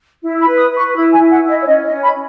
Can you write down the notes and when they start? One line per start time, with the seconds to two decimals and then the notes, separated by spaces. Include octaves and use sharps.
0.22 E4
0.40 B5
0.47 B4
0.58 D#6
0.70 B4
0.76 C#6
0.95 E4 B5
1.13 G#5
1.19 E4
1.31 F#5
1.43 E4
1.48 D#5
1.62 C#5
1.66 C#4 D#5
1.85 D#5
1.90 C#4
2.03 B5